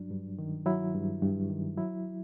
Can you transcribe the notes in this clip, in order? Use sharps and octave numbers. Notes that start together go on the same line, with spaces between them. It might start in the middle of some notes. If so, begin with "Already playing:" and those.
Already playing: G2 F#3 D4
G2
D#3
F#3 E4
G2
G2
D#3
F#3 E4